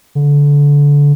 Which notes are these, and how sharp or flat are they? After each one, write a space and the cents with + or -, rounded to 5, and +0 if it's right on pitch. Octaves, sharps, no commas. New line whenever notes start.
D3 -25